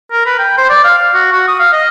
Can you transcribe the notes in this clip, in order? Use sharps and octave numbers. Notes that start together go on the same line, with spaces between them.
A#4
B4
G5
C5
D5
F5
F5
F#4
F#4
D#6
F5
D#5